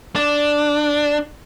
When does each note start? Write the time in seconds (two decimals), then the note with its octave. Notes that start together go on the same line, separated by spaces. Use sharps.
0.16 D4